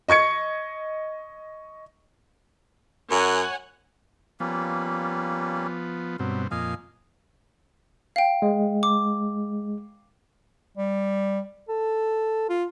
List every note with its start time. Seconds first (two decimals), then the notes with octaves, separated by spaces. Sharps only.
0.08 D#5 C#6 G#6 C#7
3.11 F#2 C#5 F#5 G#5
4.40 F3 G3 A#3 B3 C#4
6.19 G2 B2 F#3 C4
6.51 F2 A#2 D#5 F5 G#5
8.16 F5 G5
8.42 G#3
8.83 D6
10.77 G3
11.69 A4
12.49 F4